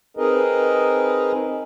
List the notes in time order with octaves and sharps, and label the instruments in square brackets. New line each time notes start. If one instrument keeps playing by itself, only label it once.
[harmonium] C4 D#4 G#4 A#4 B4 D#5